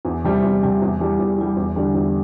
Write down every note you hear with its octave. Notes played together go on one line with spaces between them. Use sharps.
E2
C3 G3 C4
E2
C3 G3 C4
E2
E3 G3
E2
E3 G3
E2
D3 G3 D4
E2